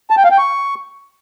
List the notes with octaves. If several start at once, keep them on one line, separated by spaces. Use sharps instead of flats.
A5
G5
F5
G5
C#6